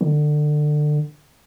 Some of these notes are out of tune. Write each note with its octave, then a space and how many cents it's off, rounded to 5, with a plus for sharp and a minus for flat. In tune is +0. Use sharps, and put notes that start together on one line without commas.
D3 +25